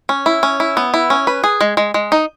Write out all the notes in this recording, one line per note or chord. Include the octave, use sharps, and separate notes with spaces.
C#4
E4
C#4
E4
B3
E4
C#4
B4
G#4
G#3
G#3
G#3
D#4